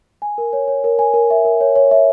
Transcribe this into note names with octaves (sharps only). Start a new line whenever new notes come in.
G#5
A#4
C#5
C#5
A#4
G#5
A#4
E5
A#4
C#5
C#5
E5